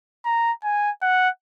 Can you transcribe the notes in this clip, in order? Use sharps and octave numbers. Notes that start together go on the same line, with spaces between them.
A#5
G#5
F#5